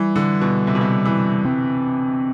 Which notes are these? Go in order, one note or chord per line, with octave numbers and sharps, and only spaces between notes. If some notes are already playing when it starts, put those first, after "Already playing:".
Already playing: E3 G3
D3
B2
C3
B2
C3
E3
C4